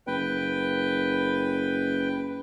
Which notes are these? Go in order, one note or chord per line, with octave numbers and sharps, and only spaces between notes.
F#1 B4 G5